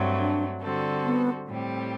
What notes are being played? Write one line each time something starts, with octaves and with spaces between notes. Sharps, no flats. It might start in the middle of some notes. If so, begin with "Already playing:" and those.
Already playing: G2 F#3 A3 C4
D4
D3 G3 C4 F#4 A4
B3
A2 G3 C4 G4